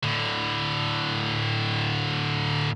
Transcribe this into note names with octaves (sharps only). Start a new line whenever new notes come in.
A2 D3